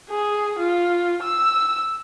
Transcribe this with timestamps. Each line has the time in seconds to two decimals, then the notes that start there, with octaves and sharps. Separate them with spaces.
0.10 G#4
0.58 F4
1.23 E6